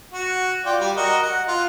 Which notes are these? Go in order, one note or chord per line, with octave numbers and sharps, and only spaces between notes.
F#4
F4 D5 G5
G3
F#4 A#4 D#5
F#5
F4